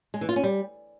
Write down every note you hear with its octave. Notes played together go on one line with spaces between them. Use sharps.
G#3
E3
F4
C#4
G3